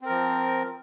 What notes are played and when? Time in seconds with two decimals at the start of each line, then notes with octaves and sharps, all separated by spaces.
0.01 C4
0.05 A#4
0.10 F3